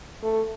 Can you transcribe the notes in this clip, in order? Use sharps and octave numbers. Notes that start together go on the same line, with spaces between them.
A3